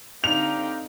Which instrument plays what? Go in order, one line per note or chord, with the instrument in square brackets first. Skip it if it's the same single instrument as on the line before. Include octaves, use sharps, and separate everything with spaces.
[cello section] D3 C4 D#4 [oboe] G4 [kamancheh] F5 A#5 [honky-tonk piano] F7